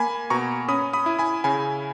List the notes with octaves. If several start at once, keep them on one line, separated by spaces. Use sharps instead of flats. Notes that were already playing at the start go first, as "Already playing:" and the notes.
Already playing: A#3 G#5 B5
B2 A#5 C#6
C#4 B5 D#6
B5 D#6
E4
G#5 B5
C#3 G#5 B5